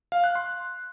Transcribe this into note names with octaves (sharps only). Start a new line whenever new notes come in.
F5
F#6
C6